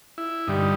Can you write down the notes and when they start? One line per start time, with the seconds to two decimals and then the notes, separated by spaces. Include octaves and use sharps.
0.18 E4
0.47 G2 D3 G3 D#4